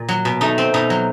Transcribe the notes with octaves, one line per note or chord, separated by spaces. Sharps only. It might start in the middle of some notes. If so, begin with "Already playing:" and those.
Already playing: A#2
F#3
B2
A3 D#4
C4
B2 D#4
F#3